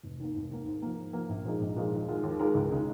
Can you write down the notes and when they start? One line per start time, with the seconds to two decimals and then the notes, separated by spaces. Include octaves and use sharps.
0.03 F1
0.19 D#2 D#3 A#3
0.35 F1
0.51 D#2 D#3 A#3
0.66 G#2
0.82 F3 A#3
0.97 G#2
1.13 F3 A#3
1.29 A#1
1.45 A#2 F3 G#3 D#4
1.61 A#1
1.76 A#2 F3 G#3 D#4
1.92 D#2
2.08 D#3 G#3 F4 A#4
2.23 D#2
2.40 D#3 G#3 F4 A#4
2.55 C#2
2.71 C#3 G#3 D#4